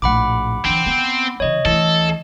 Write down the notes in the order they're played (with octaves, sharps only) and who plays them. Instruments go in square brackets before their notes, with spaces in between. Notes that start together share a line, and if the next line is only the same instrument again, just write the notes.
[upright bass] A#1 A2 [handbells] F#5 B5 D6
[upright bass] D3 E3 [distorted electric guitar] C4
[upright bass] B3
[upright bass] C#3 E3 [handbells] C#5 D#5
[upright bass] D2 E3 [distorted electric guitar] A4